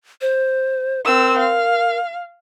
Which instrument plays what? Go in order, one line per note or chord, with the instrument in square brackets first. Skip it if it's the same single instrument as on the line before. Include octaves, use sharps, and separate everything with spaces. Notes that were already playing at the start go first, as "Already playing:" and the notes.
[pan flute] C5
[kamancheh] C4 E6 [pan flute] A#4
[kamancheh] F5